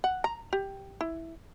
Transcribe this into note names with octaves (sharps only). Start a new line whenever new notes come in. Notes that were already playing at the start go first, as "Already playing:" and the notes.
F#5
A#5
G4
E4